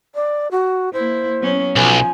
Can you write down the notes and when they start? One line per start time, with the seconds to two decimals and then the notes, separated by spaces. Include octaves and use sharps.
0.15 D5
0.51 F#4
0.93 A#3 E4 C5
1.40 F#3 B3 C#4
1.76 B1 F3 G#5